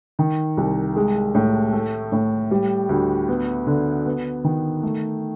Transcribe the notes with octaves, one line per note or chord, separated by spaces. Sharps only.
D#3
C2
G#3
A2
A3
A2
G3
D2
B3
D3
B3
D#3
A3